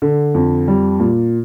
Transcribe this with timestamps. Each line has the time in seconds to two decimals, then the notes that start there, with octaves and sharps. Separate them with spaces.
0.02 D3
0.34 F2
0.68 G3
1.00 A#2